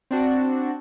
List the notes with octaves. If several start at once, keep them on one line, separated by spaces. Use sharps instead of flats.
C4 D4 F#4